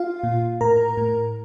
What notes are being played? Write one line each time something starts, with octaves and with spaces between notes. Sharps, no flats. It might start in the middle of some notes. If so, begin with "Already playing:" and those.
Already playing: F4 F5
A#2
A2 A#4 A#5
A2